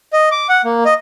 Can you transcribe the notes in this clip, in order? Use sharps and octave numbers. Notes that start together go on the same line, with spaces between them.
D#5
D6
F#5
A#3
D#5